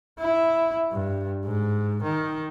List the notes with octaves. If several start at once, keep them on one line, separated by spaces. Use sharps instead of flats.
E4
G2
G#2
D#3